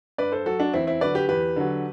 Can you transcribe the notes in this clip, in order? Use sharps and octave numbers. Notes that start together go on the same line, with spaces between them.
G2 B4 D5
A4 C5
F#3 F#4 A4
D4 F#4
E2 C4 E4
C4 E4
D3 F#3 B4 D5
G4 B4
E2 G4 B4
D3 F#3